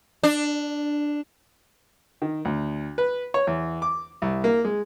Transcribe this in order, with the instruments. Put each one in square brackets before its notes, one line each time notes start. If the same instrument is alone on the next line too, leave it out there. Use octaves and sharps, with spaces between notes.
[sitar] D4
[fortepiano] D#3
D2
B4
C#5
E2
D6
C2
A#3
G#3